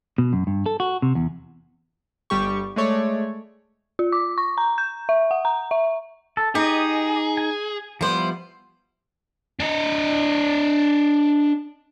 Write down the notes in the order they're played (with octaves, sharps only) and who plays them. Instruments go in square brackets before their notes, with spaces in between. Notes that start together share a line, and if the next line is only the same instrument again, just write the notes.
[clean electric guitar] B2
F#2
G2
A4
F#4
C3
E2
[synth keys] G1 G3 G4 C#6
G#3 A3 C#5 D5
[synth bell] F4
D6
C#6
A#5
G6
E5
F#5
A#5
E5
[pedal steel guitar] A4
[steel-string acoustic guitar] D#4 [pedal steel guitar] G4 D#5 [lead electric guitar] G#4
[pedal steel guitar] G#5
[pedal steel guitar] F3 G3 B3 [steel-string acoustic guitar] E4 C5
[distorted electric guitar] D4 D#5